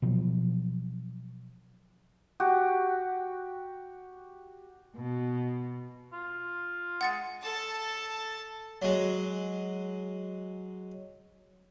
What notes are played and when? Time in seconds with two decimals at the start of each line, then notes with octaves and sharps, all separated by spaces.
0.02 B2 F3 F#3
2.40 F#4 G4
4.95 B2
6.13 F4
7.01 G#3 F#5 A6 C#7
7.42 A4 A5
8.82 F#3 G#3